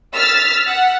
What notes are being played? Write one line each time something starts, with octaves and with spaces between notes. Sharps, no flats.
E6 F6 A6 B6
F#5